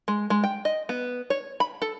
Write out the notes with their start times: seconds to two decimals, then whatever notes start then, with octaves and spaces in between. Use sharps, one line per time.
0.08 G#3
0.30 G#3
0.44 G5
0.65 D#5
0.89 B3
1.30 C#5
1.60 B5
1.82 A4